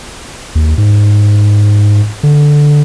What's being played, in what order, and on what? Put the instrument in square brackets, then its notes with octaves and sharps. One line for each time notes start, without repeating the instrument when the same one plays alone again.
[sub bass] D#2
G#2
D3